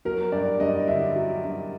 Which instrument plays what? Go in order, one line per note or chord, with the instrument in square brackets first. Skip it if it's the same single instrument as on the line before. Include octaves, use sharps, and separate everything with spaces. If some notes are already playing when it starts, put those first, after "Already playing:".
[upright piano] F#3 A#4
G2 D5
G2 D#5
D3 E5
F#3
G2